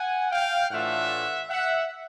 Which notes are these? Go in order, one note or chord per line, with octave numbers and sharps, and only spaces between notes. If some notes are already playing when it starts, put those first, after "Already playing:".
Already playing: F#5 G#5
F5 G5
A2 E3 A3 D4 F4 E5 F#5
E5 F#5